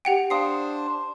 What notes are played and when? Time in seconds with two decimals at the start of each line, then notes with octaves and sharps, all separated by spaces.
0.05 G4 F#5 G5
0.30 D4 C5 F5 D#6 C7